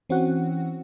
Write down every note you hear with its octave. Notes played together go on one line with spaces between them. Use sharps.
E3 C4 C#4 F#4 F#5